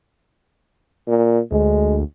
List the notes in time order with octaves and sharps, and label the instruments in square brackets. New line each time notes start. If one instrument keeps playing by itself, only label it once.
[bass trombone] A#2
[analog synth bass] D2 [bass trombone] G#3